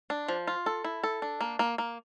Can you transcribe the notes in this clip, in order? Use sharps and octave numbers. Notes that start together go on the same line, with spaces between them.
D4
F3
F4
A4
E4
A4
D4
A#3
A#3
A#3